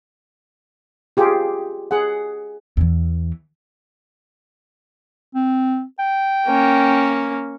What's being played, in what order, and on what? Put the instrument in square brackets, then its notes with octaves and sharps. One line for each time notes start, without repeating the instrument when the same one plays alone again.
[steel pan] F4 G4 G#4
G#4 F#5
[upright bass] E2 E3
[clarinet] C4
G5
[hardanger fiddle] A#3 C#4